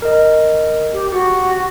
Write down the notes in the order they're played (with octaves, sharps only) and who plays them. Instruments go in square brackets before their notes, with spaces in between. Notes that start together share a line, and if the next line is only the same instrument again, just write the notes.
[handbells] A#4 D#5
[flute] G4
[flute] F#4 [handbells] G4